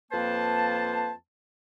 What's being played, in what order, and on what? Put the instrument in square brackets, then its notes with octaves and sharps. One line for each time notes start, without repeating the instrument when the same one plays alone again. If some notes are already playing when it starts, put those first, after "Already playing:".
[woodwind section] F2 A#3 B4 C5 A5